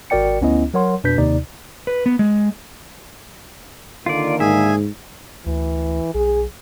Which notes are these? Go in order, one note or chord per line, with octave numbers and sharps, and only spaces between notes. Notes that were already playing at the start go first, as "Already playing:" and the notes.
G#1 F#4 A#4 D5 G5 C#7
D2 B3 C#4 E4 D#5
F#3 A#4 C#5 F#5 C6
F2 B2 D4 B4 G6 B6
D#2 C3 D#4 D5
B4
B3
G#3
D3 D#3 A#3 F4 D5
G#2 G#4 E5 G#5
D2 E3
B1 G#4